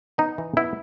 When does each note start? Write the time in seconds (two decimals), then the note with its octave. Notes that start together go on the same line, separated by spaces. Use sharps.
0.18 B3 D#4
0.38 E3
0.57 B3 E4